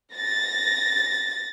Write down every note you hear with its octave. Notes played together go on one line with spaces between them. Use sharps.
A6 A#6